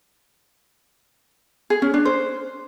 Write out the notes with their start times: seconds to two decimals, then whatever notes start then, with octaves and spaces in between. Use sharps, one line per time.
1.70 G#4
1.82 C#4
1.94 D4
2.05 C5